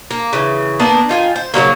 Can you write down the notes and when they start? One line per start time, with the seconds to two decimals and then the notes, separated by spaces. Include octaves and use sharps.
0.11 A#3
0.33 C#3 E3
0.80 A#3 B3 D4
1.09 D#3 F4 G#5
1.36 C5
1.54 C#3 F3 F#3 A#3